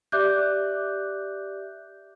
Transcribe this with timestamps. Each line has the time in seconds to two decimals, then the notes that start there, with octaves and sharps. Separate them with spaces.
0.12 G4 D5 E5 D6 F#6 G6